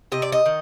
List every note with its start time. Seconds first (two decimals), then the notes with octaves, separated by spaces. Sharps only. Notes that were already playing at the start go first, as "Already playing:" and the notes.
0.12 C3 D#5
0.22 D5
0.32 D#5
0.46 D#3